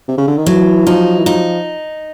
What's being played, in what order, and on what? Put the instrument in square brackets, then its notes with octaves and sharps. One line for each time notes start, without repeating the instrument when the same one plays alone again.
[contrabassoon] C3
C#3
D3
D#3
[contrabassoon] E3 [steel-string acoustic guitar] F#3
[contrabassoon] F3 [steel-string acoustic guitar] D#4
[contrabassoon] E3
[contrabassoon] F3 [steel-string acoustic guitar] D#4